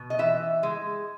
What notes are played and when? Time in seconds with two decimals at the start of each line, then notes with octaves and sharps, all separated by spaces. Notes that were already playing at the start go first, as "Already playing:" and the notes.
Already playing: B2
0.10 D#5
0.19 E3 E5
0.63 G#3